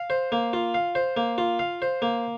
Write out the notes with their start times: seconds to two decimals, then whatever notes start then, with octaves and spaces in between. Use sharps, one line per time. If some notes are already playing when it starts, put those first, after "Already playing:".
Already playing: F5
0.10 C5
0.32 A#3
0.53 F4
0.74 F5
0.95 C5
1.17 A#3
1.38 F4
1.59 F5
1.82 C5
2.02 A#3